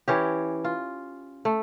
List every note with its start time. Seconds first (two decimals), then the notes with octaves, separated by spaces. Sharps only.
0.08 E3 C#4 G4
0.64 F4
1.45 A3